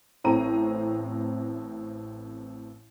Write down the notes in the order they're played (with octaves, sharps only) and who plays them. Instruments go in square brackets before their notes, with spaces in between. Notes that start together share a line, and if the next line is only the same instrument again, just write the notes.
[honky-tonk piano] A1 A2 C4 A4 A#5 D#7